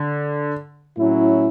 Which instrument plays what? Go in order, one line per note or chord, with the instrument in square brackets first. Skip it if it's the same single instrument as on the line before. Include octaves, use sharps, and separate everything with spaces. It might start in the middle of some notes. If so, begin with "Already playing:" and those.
Already playing: [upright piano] D3
[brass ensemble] A2 F#3 C#4 E4